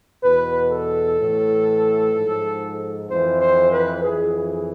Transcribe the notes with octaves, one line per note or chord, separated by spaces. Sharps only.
E2 B2 B4
A4
A2 E3
G#2 F3
F2 E3 C5
C5
B4
F2 E3 G#4
G#4